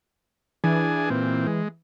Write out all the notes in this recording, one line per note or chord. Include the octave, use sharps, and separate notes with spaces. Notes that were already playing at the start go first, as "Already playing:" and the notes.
E3 D4 G#4 G#5
A#2 C4
G#3